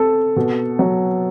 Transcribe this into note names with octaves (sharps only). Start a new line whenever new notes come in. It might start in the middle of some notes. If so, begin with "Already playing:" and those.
Already playing: C4 A4
B2
F#3